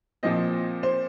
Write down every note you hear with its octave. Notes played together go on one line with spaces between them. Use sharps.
A#2 F3 C4 D#5
C5